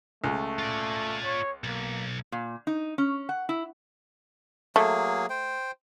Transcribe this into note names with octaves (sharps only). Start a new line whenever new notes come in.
C#2 A3
F4 D5
C#5
B1 A#3
A#2
D#4
C#4
F#5
E4
F#3 A3 A#3 G#4
C5 G5